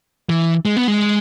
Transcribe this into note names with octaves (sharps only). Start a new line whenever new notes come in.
E3
G#3
B3
G#3